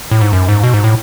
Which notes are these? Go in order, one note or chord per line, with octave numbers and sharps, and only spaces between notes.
A2
G#2
F#2
G#2
B2
G#2
A2